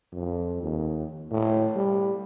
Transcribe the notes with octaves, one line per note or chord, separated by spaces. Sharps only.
F2
D#2
A2
G3